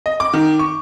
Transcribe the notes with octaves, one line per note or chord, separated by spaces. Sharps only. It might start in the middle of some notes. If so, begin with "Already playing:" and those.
D#5
D6
D#3
C#6